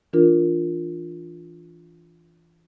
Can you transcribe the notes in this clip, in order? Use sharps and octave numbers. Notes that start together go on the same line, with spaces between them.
E3 D4 F4 A#4